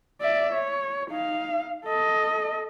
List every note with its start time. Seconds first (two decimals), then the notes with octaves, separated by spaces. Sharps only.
0.21 D5 E5
0.53 C#5
1.10 D#4 F5
1.85 A4 D#5